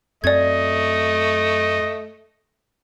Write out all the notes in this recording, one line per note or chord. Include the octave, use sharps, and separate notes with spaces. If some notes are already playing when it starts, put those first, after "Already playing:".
F#2 A3 C4 D5 D#5 G#6